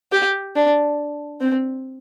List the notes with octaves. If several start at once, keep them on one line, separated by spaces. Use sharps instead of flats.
G4
D4
C4